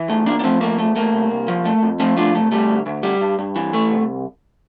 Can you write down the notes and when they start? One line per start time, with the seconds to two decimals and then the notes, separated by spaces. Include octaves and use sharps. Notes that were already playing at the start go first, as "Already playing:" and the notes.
Already playing: E3
0.08 E2 A3
0.26 E2 A#3 D4
0.39 D4
0.44 F3 A3 C4
0.61 A3 A#3
0.78 E2 A3
0.96 A3 A#3
1.12 C2
1.30 C2
1.48 F3
1.65 A3
1.82 F2
2.00 F3 A3 C4
2.17 A3 D4 F4
2.34 C2 A3
2.52 G3 A3
2.69 D2
2.86 D2
3.03 G3
3.21 G2
3.38 G2
3.56 E3
3.73 A3
3.91 C2